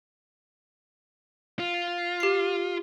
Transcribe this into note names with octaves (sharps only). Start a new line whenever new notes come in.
F4
G4 C7